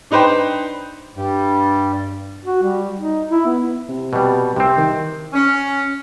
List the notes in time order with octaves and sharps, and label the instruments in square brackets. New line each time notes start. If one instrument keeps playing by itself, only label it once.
[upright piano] D4 D#4 B4 C5 G5
[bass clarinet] G2 [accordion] G3
[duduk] F#4
G3
D#4
E4
B3
[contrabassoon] C3
[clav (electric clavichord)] B2 G3
[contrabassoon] C2 [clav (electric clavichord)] C3 C4
[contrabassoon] D#3
[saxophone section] C#4